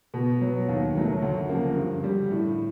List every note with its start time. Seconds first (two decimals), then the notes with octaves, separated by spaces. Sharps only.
0.14 B2
0.41 F#3 B3
0.69 D#2
0.95 D#3 F#3 A3
1.22 D2
1.49 C#3 F3 A#3
1.76 G2
2.04 D3 G3
2.30 A2